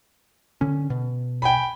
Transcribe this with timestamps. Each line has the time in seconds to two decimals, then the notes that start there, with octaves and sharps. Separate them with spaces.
0.61 D3 C#4
0.90 B2
1.42 G5 G#5 B5